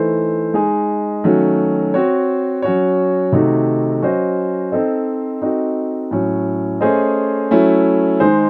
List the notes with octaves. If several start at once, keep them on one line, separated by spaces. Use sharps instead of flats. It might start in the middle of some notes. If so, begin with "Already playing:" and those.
Already playing: E3 A3 D#4 A4 C5
G#3 D#4 G#4
D#3 F#3 A3 C#4 F#4
C4 F#4 C#5
F#3 C#4 F#4 C#5
C3 D#3 A3 D#4 F#4
F#3 C#4 F#4 C5 D#5
C4 D#4 A4 C5 D#5
C4 D#4 F#4 A4 D#5
A2 F#3 C#4
A3 C#4 G#4 C5 D#5
F#3 A3 C#4 E4
D#3 G#3 D#4 G#4 C5